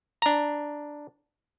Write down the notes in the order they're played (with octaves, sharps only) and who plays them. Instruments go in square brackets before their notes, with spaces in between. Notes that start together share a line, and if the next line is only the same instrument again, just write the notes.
[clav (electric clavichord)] D4 A#5